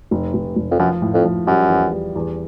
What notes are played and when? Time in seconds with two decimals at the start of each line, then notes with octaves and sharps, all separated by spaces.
0.11 F1
0.34 F1
0.56 F1
0.71 F2
0.79 F#2 F3
1.02 A2
1.13 F2
1.25 F3
1.47 F#2 G3
1.69 E2
1.92 G3
2.16 E2